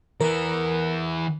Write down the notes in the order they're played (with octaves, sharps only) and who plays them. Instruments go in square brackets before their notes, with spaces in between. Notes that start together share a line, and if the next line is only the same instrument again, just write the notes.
[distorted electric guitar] E3 B3 [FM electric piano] A#4